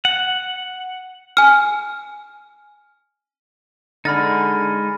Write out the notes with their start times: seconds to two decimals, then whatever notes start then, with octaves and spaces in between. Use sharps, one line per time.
0.05 F#5
1.37 G#5 F6
4.05 D3 G#3 D#4 B5 F6 A6